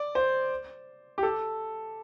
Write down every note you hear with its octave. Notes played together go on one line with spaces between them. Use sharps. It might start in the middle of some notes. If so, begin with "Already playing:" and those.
Already playing: D5
C5
G4
A4